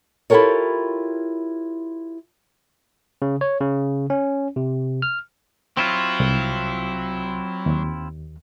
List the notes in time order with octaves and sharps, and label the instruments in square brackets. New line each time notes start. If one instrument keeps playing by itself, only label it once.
[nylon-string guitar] E4 F4 G4 A4 A#4 C#5
[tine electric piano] C#3
C#5
C#3
C#4
C3
F6
[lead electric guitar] F#3 [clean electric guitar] C4 E4 F4
[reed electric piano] C2
D#2